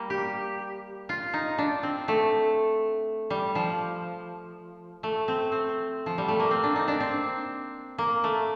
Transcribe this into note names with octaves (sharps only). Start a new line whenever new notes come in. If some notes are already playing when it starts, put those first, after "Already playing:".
Already playing: G3 A#3
G4
F4
D#4
D4
C4
A3
G3
F3
A3
C4
C4
F3
G3
A3
A#3
C4
D4
D#4
D4
C4
A#3
A3